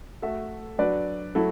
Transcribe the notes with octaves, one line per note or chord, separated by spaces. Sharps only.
A3 F#4 A4 E5
F#3 D4 F#4 B4 D5
F#3 A3 E4 A4